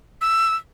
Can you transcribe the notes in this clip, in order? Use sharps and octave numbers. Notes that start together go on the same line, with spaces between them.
E6